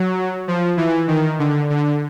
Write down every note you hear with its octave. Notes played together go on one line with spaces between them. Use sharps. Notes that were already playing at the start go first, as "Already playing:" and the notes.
Already playing: F#3
F3
E3
D#3
D3
D3